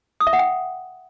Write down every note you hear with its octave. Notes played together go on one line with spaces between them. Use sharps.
D#6
E5
F#5
G5